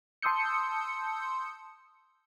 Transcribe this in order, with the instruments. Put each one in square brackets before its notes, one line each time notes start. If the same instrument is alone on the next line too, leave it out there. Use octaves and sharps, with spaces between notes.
[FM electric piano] A5 C6 D#6 E6 G6 C#7